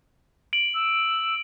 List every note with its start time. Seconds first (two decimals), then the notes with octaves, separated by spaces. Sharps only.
0.53 D7 F#7
0.74 E6